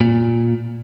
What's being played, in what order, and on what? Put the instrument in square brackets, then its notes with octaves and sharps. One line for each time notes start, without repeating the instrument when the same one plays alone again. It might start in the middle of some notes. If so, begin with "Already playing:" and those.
[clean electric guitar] A#2